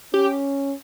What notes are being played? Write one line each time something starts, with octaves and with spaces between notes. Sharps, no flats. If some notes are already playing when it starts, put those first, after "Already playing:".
C#4 G4